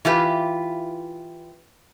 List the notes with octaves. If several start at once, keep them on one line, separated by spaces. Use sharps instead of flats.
E3 F4 G4 B4